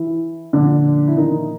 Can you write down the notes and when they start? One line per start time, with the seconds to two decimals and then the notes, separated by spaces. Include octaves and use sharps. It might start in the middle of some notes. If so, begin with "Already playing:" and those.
Already playing: E3 E4
0.53 A#2 D3 F3 D4
1.08 E4
1.17 D#3 D#4